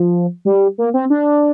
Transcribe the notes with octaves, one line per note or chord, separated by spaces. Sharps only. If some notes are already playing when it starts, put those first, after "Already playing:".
Already playing: F3
G3
A#3
C4
D4